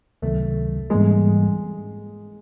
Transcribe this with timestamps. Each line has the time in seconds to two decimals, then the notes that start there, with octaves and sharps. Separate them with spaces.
0.22 C#2 C3 D#3 F#3 A3
0.90 G#2 E3 G3 G#3 A#3